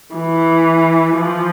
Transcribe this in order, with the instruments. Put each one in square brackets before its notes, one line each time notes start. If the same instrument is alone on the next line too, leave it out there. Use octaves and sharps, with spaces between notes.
[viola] E3
F3